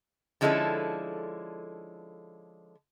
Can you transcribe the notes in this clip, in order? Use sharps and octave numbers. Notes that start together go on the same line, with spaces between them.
D3 F3 G#3 C#4 E4 A4